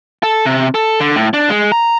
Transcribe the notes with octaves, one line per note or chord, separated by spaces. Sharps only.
A4
C3
A4
D3
A2
D4
G#3
A#5